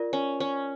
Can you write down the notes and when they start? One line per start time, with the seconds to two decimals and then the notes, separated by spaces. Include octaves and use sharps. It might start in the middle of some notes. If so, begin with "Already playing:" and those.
Already playing: F4 A#4 D5
0.13 C#4
0.40 C#4